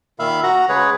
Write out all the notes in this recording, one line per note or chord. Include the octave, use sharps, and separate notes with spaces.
A#2 D#3 E5 F5 B5
F#4 F#5 A#5
C#3 G#3 G#4 B4 C#5